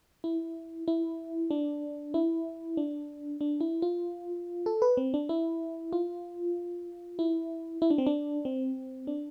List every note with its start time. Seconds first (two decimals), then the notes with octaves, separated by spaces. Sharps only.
0.24 E4
0.88 E4
1.51 D4
2.14 E4
2.77 D4
3.41 D4
3.61 E4
3.82 F4
4.66 A4
4.82 B4
4.97 C4
5.14 D4
5.29 E4
5.93 F4
7.19 E4
7.82 E4
7.90 D4
7.98 C4
8.07 D4
8.45 C4
9.07 D4